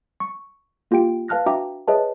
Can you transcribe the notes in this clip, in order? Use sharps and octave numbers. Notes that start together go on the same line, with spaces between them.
C#6
A#3 F4 G4 G5 D7
B4 F5 A5 F6 F#6 A#6
D4 F#4 E5 G5 A#5 D6
G#4 B4 C#5 D#5 E5 A5